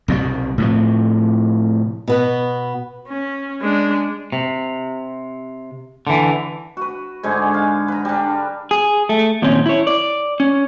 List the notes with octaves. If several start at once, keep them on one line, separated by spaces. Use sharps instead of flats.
C2 B2 F#3 G3
A2 C3 F3
B2 B3 B4
C#4
G#3 D4
C3
D3 E3
F#4 B4
G#2 D3 G#3
F5
B4 A#5
G3 D4
G#4
A3
A#2 D#3 F#3 C4 C#4
E4 C#5
D5
C#4